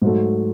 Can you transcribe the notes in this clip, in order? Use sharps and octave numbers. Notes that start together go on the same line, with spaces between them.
G#2 F#3 A3